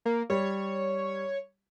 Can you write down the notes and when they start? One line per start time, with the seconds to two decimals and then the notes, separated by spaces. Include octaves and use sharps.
0.05 A#3
0.30 G3 C#5